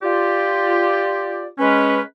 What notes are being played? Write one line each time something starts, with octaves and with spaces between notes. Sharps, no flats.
F4 G4 D5
G#3 C#4 B4